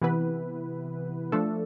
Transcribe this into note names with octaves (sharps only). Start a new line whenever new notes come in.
C3 E3 B3 E4 B4
F3 A3 D4 A4